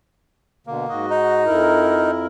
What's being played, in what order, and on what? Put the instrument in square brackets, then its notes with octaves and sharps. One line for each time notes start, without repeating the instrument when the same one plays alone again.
[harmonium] B2 D3 [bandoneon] A#3
[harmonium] G#2 F#4 D#5
[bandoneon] D#4
[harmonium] F2 E4 A#4